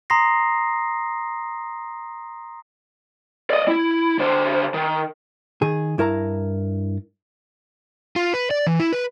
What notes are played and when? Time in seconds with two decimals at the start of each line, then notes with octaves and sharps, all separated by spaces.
0.10 A#5 C6 D#6 A#6 C7
3.50 D5 D#5
3.68 E4
4.19 D3 C5
4.74 D#3
5.62 D#3 G#4
5.98 G2 E4 A#4 A5 A#5
8.16 F4
8.34 B4
8.51 D5
8.67 E3
8.79 E4
8.93 B4